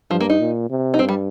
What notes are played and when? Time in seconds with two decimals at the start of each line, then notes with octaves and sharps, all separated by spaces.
0.10 G2 F3
0.20 A#3
0.30 D#4
0.39 A#2
0.70 C3
0.94 D#4
0.99 G2 C4
1.09 G3